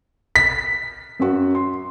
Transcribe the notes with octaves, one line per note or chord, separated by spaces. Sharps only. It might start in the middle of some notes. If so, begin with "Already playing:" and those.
B6
F#2 F#4
C6